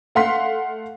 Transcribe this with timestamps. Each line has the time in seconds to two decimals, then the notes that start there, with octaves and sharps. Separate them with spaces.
0.15 A3 F5 F#5 C6 B6